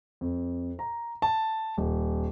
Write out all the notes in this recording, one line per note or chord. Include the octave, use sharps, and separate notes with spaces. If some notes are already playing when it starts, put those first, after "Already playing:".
F2
A#5
A5
D#1